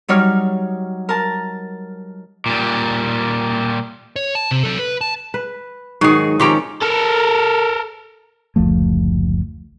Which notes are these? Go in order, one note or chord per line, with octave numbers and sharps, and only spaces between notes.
F#3 G3 D#4 C#5 F6
A#4 A5
A#2 G3
C#5
A5
C3
F#3 A4
B4
A5
B4
G#2 D#3 F#3 F#4 G#4
D#3 F3 C4 C#4 G4 A#5
A4 A#4
F#1 D2 F3 A3